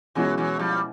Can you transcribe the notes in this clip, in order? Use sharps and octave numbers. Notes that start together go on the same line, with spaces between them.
B2 E3 F#3 G#3 C#4 E4
E3 F#3
F3 G3